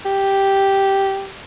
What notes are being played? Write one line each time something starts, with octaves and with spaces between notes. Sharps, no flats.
G4